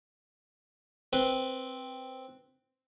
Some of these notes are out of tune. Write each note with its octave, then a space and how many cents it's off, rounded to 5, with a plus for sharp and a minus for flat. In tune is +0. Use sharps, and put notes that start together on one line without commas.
C4 +0 B4 +0